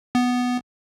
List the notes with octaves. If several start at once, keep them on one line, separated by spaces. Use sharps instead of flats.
B3